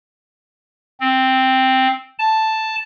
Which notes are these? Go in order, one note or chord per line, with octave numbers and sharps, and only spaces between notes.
C4
A5